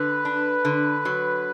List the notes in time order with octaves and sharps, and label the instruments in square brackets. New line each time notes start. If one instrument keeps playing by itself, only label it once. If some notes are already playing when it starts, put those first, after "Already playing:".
Already playing: [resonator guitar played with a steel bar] D3 [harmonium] B4
[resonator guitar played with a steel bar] D4
D3
F#3